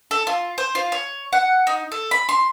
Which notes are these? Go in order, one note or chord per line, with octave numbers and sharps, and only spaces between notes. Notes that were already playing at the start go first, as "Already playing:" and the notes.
A4
F4
C5
F4
C#5
F#5
D#4
A4
B5
C6